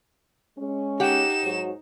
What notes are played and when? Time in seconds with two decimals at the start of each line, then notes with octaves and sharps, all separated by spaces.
0.58 G#3 C#4
1.00 D#4 G4 F#5 E7
1.43 G#2 F#3